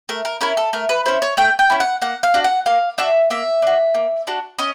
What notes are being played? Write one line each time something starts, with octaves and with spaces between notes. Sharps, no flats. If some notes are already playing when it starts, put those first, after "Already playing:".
A3 A#4
A#4
C#4 E4 A#4
A4
A3 A#4
B4
C#4 E4 C5
C#5
A3 G5
G5
C#4 E4
F#5
A#3 F#5
F5
D4 F#4
F#5
A#3 F5
D4 F#4 E5
A#3 E5
D4 F#4
A#3
D4 F#4
C#4 D#5